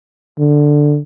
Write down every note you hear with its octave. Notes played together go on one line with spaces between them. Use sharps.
D3